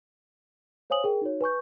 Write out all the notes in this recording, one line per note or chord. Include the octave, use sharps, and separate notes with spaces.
C5 C#5 F5 G#5 D#6 F#7
G#4 A#4 G5
D#4 F#4 C#5
B4 G#5 C#6 G6